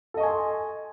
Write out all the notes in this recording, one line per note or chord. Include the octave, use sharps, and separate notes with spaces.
A4 D#5 G#5 C6 C#6